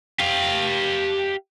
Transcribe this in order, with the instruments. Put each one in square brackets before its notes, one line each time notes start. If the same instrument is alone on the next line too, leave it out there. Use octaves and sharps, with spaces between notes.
[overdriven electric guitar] G4 F5